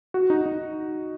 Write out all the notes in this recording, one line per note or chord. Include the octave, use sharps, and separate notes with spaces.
F#4
D#4
D#4